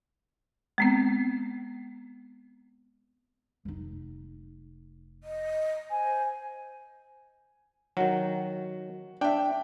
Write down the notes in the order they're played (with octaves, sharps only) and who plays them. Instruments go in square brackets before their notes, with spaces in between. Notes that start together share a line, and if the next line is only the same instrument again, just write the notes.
[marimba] G#3 B3 C4
[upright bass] F1 D#4
[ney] D#5
[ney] C5 [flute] G#5
[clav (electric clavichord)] D#3 F#3 [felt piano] F#4
[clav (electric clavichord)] D4 [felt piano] E5 G5